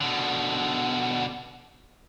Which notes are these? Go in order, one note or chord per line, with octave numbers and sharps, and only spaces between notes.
B2 D3